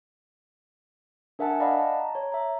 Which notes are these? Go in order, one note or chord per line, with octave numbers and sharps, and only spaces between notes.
D4 A#4 E5 F#5 G#5 A5
D5 D#5 F5 F#5 B5
A5
A#5
C#5
E5 A#5